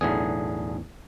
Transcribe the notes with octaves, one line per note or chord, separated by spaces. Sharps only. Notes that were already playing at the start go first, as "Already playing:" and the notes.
B1 E2 A2 D3 G#4